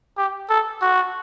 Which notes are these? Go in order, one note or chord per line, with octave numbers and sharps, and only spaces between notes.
G4
A4
F#4